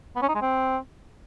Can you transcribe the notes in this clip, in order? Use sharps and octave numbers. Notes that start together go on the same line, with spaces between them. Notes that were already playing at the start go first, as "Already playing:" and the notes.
B3
C#4
D#4
G#3
C4